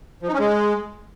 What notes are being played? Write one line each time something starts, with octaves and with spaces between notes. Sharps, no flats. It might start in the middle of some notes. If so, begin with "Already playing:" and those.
F3
D#4
C#4
G#3